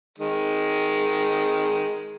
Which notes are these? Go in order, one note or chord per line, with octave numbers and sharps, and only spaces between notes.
D#3 G#3